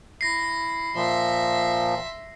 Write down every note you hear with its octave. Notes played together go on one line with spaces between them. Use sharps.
E4 A#6 C7
A#2 F3 E5 C6